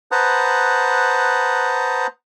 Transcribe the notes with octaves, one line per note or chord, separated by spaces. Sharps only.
B4 C5 F#5 A5 A#5 D#6